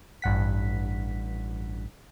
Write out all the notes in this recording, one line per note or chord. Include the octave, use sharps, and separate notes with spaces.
A1 G2 F#5 B6